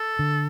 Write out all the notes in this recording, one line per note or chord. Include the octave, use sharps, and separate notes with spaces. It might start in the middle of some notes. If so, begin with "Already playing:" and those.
Already playing: A4
D3